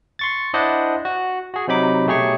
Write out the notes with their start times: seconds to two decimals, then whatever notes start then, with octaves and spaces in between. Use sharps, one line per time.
0.19 C6 C#6 A6
0.54 D4 E4 C5 D5 D#5 F#5
1.05 F#4
1.54 F#4 G#4
1.68 C3 F#3 D#4 B5 D6
2.07 B2 A3 G4 G#4 C#5 C#6